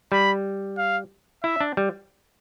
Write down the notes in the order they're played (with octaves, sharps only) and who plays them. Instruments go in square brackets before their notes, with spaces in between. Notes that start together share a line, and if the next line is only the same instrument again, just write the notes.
[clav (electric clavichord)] G3 [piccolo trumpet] B5
[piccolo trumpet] F5
[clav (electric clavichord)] E4 [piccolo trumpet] E5
[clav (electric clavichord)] D4
G3